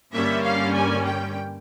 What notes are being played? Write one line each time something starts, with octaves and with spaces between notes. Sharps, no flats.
G2 D3 G3 A#3 C#4 E5
F5
G#5
G5